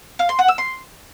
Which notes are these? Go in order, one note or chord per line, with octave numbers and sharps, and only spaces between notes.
F5
C6
F#5
E6
C6